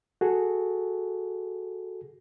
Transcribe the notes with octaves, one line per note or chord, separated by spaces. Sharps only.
F#4 G#4 A4